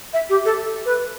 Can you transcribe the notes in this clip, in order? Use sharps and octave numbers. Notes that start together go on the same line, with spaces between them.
E5
G4
A4
B4